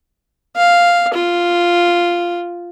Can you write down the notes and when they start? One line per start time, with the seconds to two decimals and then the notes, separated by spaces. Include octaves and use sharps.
0.57 F5
1.14 F4